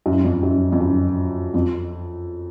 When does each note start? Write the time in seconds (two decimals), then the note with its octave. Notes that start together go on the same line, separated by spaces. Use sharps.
0.06 F#2
0.24 F2
0.43 F#2
0.72 F2
0.80 F#2
1.54 F2